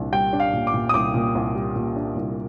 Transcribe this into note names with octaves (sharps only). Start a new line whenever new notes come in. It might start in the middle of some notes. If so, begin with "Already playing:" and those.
Already playing: C2 A#2 D4
G3 G5
D4
F5
A#2
D6
A#2
D#6
C2 D6
A#2
C2
G3
A#2
D4
C2